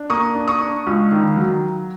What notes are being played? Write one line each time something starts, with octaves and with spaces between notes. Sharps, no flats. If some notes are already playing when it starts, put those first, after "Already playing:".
Already playing: D4
A#3 C#6 D#6
D4
C#6 D#6
D4
C#2
D#3
F#3